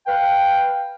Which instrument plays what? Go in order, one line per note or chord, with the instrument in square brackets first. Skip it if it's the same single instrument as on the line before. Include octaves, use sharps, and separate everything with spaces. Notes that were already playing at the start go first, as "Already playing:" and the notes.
[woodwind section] B4 F5 G5